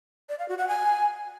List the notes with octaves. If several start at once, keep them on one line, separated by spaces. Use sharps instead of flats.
D5
F5
F#4
F#5
G#5